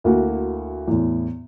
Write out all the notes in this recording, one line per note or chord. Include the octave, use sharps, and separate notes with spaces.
D2 A#3 E4 F#4
E2 A2